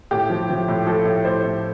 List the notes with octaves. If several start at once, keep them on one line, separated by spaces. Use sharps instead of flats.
A2 G4
F3
F3
A2
F3 A4
A2
A2 C5
A2